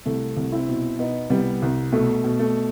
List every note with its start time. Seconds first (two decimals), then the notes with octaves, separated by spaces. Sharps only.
0.05 C2 A3
0.36 C2
0.52 C4 E4
0.68 B2
0.99 B2 B3 D#4
1.30 C2 G3 B3
1.62 C2
1.92 B2 A3
2.24 B2
2.39 A3